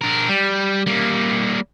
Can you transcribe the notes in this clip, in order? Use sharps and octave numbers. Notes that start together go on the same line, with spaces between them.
D4 A#4
G3
G3 A#3